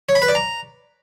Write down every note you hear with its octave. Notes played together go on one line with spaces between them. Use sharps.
C#5
B5
B4
D5
A#5